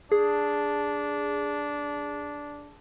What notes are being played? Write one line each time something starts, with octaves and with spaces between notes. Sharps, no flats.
D4 G#4